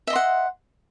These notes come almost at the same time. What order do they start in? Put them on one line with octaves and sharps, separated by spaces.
E5 D#5 C6 F#5